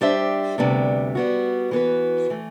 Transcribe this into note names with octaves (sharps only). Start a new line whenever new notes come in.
G3 D4 G4 C5 E5
D2 C3 G3 B3 D4
G3 B3 F#4
E3 B3 F#4 B4
E3 A3